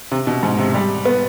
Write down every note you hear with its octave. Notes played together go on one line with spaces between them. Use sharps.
C3
B2
G#2
C3
G3
B3